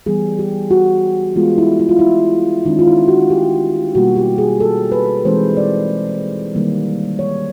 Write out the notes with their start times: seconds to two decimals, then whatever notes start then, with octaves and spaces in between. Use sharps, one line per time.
0.06 E3 G3 B3 G#4
0.39 G4
0.71 F#4
1.36 E3 G#3 B3 F4
1.58 E4
1.79 E4
1.89 F4
1.99 E4
2.65 D#3 G#3 C#4 D#4
2.79 F4
2.87 E4
3.08 F#4
3.30 G4
3.95 B2 G3 A#3 F#4
4.16 G4
4.38 G#4
4.60 A4
4.92 B4
5.25 E3 G#3 C4 D#4 C5
5.57 D5
6.55 D#3 G3 A#3
7.19 C#5